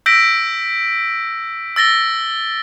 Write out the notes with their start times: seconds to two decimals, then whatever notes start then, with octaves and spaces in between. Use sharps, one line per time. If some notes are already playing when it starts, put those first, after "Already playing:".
0.06 E6 G6 A#6 B6 D7
1.76 E6 A6 A#6 G7